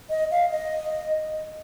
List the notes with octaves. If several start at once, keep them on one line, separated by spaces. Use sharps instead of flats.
D#5
F5
D#5